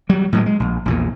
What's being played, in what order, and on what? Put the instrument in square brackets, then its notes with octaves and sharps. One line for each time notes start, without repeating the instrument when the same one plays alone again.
[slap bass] F#3 G3
A2 F#3 G#3
G#3
A#1
A#1 E2 A#2